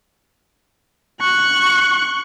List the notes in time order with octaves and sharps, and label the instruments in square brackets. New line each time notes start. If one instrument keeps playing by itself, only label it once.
[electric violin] C#6 F#6